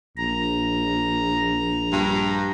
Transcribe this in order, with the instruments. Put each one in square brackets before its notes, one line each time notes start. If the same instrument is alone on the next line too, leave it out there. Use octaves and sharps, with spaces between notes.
[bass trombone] A#1 [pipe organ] A#5
[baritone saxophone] G2